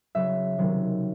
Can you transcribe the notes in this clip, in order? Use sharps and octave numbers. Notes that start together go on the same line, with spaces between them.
C#3 F#3 E5
C3 D#3 F#3